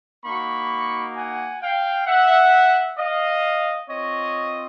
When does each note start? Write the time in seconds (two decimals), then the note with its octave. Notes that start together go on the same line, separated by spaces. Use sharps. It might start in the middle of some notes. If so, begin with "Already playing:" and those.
0.25 A#3 D#4 F#4 B5 C#6
1.16 F#5 G#5
1.62 F5 G5
2.07 E5 F#5
2.99 D#5 F5
3.89 C4 F4 C#5 D#5